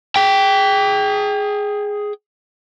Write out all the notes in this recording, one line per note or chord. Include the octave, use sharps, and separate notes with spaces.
G#4 G5